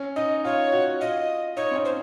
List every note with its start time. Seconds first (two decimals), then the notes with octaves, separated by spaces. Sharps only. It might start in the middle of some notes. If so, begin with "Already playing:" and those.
Already playing: C#4
0.16 D#4 D#5
0.44 F4 C#5
0.73 F#4
1.01 F4 D#5
1.57 D#4 C#5
1.71 C4
1.76 C#4
1.85 C5